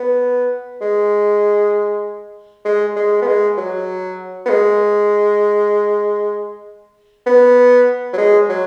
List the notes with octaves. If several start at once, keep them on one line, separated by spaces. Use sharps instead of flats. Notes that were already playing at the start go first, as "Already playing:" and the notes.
Already playing: B3
G#3
G#3
G#3
B3
G#3
F#3
B3
G#3
B3
F#3
G#3
F#3